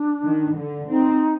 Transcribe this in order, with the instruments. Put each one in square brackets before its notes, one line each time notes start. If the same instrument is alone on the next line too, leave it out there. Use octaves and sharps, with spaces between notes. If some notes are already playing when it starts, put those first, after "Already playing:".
Already playing: [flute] D4
[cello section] D#3
D3
[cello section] C4 [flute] D#4